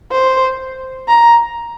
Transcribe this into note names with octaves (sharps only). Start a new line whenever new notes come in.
C5
A#5